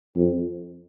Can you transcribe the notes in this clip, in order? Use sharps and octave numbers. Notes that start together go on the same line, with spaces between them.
F2